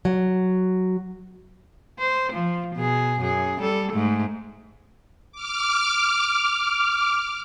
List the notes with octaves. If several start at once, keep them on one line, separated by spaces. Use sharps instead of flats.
F#3
C5
F3
B2 G#4
F#2 G#4
G3 A4
G#2 A3
D6 F6